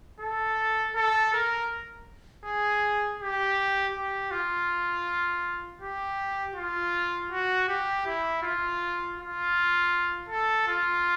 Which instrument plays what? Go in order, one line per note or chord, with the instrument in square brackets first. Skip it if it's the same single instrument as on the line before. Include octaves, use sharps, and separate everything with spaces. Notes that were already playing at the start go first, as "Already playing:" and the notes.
[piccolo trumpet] A4
A4
A#4
G#4
G4
G4
F4
G4
F4
F#4
G4
E4
F4
F4
A4
F4